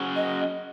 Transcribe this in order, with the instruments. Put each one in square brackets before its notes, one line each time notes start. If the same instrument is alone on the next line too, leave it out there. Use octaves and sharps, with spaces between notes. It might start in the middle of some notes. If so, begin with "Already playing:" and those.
Already playing: [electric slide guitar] F#3 C#4 G#4
[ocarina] D#5